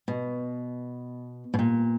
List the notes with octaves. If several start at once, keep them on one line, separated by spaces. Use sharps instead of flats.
B2
B2
A#2